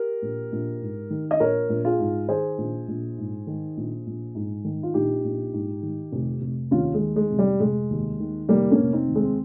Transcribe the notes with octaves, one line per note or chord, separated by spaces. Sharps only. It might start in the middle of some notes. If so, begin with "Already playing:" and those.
Already playing: G4 A#4
A#1
A#1
G#2
D#3
D#5
A#1 A#4 C#5
A#1
F4 G#4
G#2
D#3 G#4 C5
A#1
A#1
G#2
D#3
A#1
A#1
G#2
D#3
F4
A#1 D#4 G4
A#1
G#2
D#3
F1
F1
D#2 C#4 F4
G#3
D#3
G#3
F1
G3
F1 G#3
D#2
D#3
F1 G3 A#3
A#3 C#4
F1
C4 D#4
D#2
G#3 C4